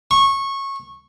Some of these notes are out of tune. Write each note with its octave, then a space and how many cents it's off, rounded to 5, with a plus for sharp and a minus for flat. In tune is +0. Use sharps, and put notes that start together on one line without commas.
C#6 -15